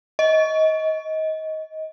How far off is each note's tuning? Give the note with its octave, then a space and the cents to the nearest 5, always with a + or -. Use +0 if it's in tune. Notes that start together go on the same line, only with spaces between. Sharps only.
D#5 +20